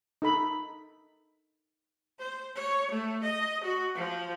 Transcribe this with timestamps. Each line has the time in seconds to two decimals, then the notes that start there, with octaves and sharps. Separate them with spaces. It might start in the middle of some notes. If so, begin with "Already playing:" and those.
0.22 D#4 A4 B5
2.19 C5
2.55 C#5
2.91 A3
3.23 D#5
3.63 F#4
3.95 F3